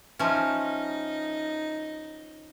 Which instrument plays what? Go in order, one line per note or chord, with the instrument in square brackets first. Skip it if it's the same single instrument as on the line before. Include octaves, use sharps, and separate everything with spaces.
[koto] F3 C#4 [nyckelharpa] D#4 [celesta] E5 A5 F6